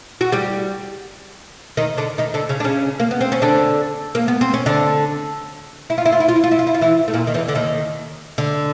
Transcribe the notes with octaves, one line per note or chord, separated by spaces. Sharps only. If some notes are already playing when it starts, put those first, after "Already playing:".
F#4
G3 G4
D#3 D#4
D3 D4
D#3 D#4
D3 D4
C#3 C#4
D4
C#3 C#4
A#3
B3
C4
C#4
D3 D4
A#3
B3
C4
C#4
D3 D4
E4
F4
E4
F4
E4
F4
E4
F4
E4
F4
E4
F4
E3 E4
A3
A#2 A#3
D#3
E2 E3
D3
D#2 D#3
D3